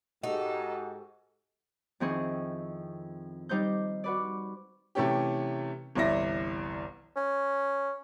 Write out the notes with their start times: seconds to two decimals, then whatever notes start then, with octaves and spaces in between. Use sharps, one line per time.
0.23 G#2 D#4 F#4 G4 A4
2.00 F2 D#3 C4 E4 G#4 C#6
3.49 G3 D#4 C5 G6
4.04 F#4 B4 D5
4.95 C3 E3 A3 C#4 G4
5.95 G1 C2 E3 D5 E5 A#6
7.16 C#4